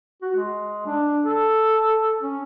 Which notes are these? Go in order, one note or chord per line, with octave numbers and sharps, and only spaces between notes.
F#4
G#3
D4
A4
C#4